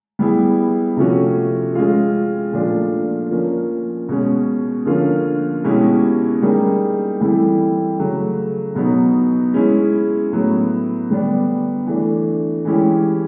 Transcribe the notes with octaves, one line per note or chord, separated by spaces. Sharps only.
G3 B3 E4 G#4
C3 F3 A3 C#4 F#4
G#3 C#4 F4
A#2 F3 A3 D4 F4
F3 A#3 C#4
B2 G#3 C#4
D3 F3 A#3 C#4 F4
B2 G#3 C#4 E4 G4
G3 A#3 D#4 G#4
E3 G3 C4 E4 A4
C#3 F#3 A3
B2 F#3 B3 D#4
G#3 C#4 E4 G#4
A2 F#3 B3
D3 G3 B3 D4
E3 A3 D4
E3 G#3 C#4 E4 G4